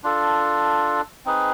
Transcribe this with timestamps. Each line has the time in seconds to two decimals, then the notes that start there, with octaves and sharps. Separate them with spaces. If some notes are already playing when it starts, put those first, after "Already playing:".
0.03 D4 F4 A4
1.26 C4 D#4 G#4 B4